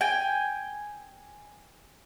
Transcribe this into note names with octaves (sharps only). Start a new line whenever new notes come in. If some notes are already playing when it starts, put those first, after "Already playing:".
G5 G#5